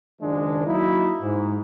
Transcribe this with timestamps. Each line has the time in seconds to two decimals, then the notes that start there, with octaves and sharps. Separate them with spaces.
0.22 F#1 D#3 F3 G#3 D4
0.67 F#3 A#3 D#4 E4
1.21 G#2